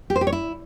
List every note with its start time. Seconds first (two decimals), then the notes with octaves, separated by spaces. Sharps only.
0.10 G4
0.16 C5
0.21 G4
0.27 C#5
0.32 E4